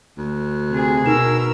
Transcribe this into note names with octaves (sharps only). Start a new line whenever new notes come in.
D2
C3 G#4
B2 D#4 A#4 E6 E7